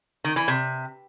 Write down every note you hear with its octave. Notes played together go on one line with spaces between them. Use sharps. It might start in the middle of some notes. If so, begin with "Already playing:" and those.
D#3
E3
C3